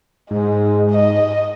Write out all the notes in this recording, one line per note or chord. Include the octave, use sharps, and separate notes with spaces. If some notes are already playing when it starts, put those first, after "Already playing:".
G#2 G#3
D#5